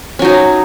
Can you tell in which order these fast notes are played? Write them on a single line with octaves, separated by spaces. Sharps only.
C#4 F#3 D#4